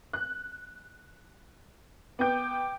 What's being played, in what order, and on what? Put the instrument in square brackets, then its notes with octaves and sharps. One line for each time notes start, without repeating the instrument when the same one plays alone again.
[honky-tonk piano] F#6
[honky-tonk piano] B3 G6 [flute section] G5 D6